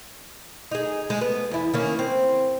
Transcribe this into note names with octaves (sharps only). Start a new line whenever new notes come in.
D#4 G#4
G#3
B3
E2 E4
D#3 A#3 C#4
C4